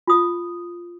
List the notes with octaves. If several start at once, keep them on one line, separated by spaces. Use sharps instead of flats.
F4 D#6